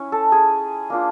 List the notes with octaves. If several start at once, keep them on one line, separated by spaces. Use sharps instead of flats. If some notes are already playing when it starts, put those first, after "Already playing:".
Already playing: C#4 E4
A4
G#4
A#3 D4 F4